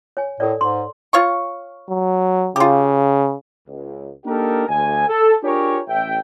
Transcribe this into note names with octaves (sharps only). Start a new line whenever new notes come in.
C#5 G#5
A2 A4 A#4 D5
G#2 C6
F4 C#5 C#6
F#3
C#3 F4 G4
C#2
A#3 D4 D#4 G4 A4 A#4
D2 G#5
A4
D4 F4 G4 G#4 A#4 C#5
A1 E5 G5